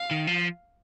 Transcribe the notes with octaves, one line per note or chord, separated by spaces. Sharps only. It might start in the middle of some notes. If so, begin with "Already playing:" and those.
Already playing: F5
D#3
F3